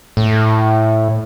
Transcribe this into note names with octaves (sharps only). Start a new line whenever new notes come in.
A2